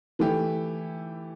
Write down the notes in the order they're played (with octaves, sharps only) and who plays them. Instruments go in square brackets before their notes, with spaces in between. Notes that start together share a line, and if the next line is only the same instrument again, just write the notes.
[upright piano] E3 A3 E4 G4